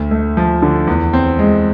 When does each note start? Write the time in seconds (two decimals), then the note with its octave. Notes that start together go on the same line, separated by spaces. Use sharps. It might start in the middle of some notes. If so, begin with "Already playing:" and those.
Already playing: D2
0.11 A3
0.37 F3
0.62 D3
0.87 E2
1.13 C4
1.39 G#3